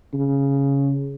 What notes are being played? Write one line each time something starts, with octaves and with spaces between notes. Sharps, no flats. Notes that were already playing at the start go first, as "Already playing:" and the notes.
C#3